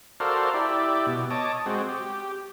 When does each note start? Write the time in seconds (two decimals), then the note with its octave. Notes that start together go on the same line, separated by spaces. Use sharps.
0.20 F#4 A4 A#4 C5 D5 F5
0.54 E4 G4 D5
1.06 B2
1.30 C#5 D#5 A5 D6
1.66 G#3 C4 F#4
1.89 G4